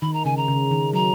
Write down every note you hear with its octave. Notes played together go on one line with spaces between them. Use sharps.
D#3 B5
A#5
C#3 G#5
A#5
C#3
D#3
F#3 A#5